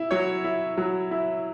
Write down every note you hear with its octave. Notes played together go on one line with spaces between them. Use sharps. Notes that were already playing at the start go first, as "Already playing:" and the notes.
Already playing: E4
F#3 C#5
E4
F#3
E4